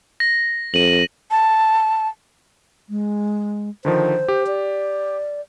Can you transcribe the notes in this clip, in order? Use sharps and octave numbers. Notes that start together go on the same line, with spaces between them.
A#6
F2 D#7 F#7
A5
G#3
D3 D#3 F3 C5
G4
D5